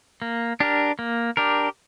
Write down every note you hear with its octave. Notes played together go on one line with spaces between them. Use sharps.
A#3
D4 G4 A#4
A#3
D4 G4 A#4